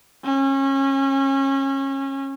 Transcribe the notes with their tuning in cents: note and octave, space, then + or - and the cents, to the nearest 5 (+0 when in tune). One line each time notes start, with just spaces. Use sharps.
C#4 -25